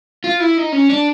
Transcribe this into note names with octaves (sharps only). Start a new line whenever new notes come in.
F4
E4
D#4
C#4
D4